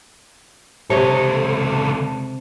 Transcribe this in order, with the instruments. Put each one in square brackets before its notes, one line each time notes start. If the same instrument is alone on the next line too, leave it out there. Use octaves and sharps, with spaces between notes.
[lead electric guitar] C#2 A4 [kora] C3 C#5 D#5